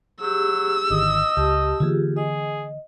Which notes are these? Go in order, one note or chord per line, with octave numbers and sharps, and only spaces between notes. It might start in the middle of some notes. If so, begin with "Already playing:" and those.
F#3 G4 G#4 E6
G#1 D3 D#3 D#5
C#2 G4 A5
D3 E3 A#3 F4 G4 G#4
G#4 D#5